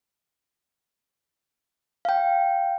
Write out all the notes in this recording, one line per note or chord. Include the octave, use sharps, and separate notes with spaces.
F5 G5